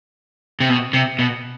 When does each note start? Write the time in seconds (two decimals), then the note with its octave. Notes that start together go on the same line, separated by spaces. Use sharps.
0.60 C3
0.69 B2
0.93 C3
1.19 B2